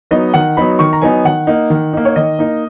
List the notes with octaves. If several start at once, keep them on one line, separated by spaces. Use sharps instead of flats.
F#3 B3 D#4 D#5
D#3 F#5
F#3 B3 D#4 B5
D#3 C#6
A#5
F#3 B3 D#4 G#5
D#3 F#5
A#3 D#4
D#3
A#3 D#4
C#5
D#3 D#5
A#3 D#4